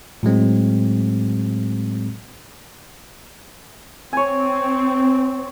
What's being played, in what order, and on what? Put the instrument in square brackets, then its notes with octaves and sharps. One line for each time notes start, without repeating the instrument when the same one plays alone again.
[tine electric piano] A2 F#3 G#3 C4
[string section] C4 [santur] C#5 G#5